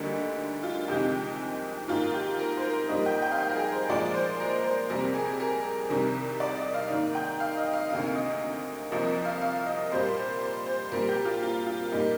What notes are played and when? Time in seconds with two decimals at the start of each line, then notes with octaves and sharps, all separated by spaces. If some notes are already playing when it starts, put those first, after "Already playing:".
Already playing: D2 D3 G3 A#3 D#4
0.63 F4
0.88 F2 C3 D#3 G#3 G4
1.88 G#2 D#3 A#3 F4
2.14 G4
2.39 A#4
2.57 C5
2.64 A#4
2.89 G#2 G3 A#3 D#5
3.06 G5
3.22 G5
3.31 F5
3.38 G5
3.49 A#4
3.55 G#4
3.73 C5
3.89 A#2 F3 G#3 D5
4.14 C5
4.40 A#4
4.64 C5
4.89 F2 C3 G3 A#3 A#4
5.14 G#4
5.40 A#4
5.89 C2 C3 D#3 G3
6.40 D5
6.57 D#5
6.74 F5
6.90 G#2 D#3 A#3
7.15 G5
7.40 F5
7.57 D#5
7.73 F5
7.90 D2 C3 D#3 A#3 F5
8.15 D#5
8.91 C2 C3 F3 A#3 D#5
9.25 F5
9.42 F5
9.66 D#5
9.92 A#2 G3 A#3 C5
10.17 C5
10.41 C5
10.66 C5
10.92 A#2 G3 A#3 A#4
11.09 G4
11.25 F4
11.42 F4
11.66 F4
11.92 A#2 G3 A#3 D#4